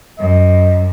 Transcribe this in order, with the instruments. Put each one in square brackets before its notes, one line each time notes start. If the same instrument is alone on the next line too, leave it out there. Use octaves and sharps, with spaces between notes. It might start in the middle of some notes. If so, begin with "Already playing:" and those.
[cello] F#2 [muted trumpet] D#5